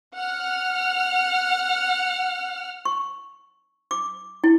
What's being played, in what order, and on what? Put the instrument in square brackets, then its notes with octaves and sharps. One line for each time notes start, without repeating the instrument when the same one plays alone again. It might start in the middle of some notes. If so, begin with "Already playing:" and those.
[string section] F#5 F6
[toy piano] C#6
D6
E4